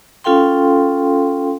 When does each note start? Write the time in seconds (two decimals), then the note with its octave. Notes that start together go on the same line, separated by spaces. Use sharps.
0.24 C#4 F4 A4 F5 G5 C6